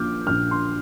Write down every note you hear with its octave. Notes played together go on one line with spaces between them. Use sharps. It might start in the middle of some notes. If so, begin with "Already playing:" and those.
Already playing: A#1 A#2 F3 D6 F6 G6
A#1 A#2 F3 F6
C6